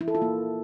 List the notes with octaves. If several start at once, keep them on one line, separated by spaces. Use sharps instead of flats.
E4
A4
F4
A#3